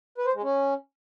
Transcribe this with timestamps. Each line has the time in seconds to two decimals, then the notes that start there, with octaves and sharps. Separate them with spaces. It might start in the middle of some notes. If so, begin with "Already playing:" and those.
0.18 B4
0.26 C5
0.35 G#3
0.43 C#4